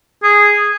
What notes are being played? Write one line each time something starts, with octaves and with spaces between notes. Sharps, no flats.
G#4